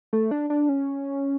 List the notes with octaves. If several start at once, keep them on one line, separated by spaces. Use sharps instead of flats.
A3
D4
D4
C#4